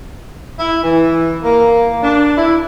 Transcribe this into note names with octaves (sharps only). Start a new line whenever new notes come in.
E4
E3
A#3
D4
E4